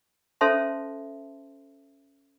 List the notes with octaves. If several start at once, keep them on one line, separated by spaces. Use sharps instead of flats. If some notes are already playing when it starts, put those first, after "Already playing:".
C#4 A4 C5 E5 A5 C6